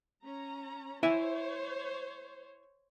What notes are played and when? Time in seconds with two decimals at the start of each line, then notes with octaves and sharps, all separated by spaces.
0.23 C#4 A#5
1.03 E4 C5 C#5 E5 G#5